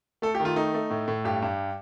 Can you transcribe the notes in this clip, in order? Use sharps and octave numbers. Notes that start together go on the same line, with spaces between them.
A3 A4
G4
D#3
F4
A3 D#4
A3
A2
A2
G2 G4
G2